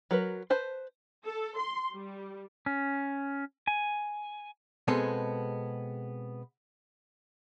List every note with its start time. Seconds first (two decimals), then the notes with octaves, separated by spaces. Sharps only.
0.11 F#3 A#4 B4
0.50 B4 C5 A5
1.26 A4
1.57 C6
1.93 G3
2.66 C#4
3.67 G#5
4.88 B2 G#3 B3 C4 G#4 A4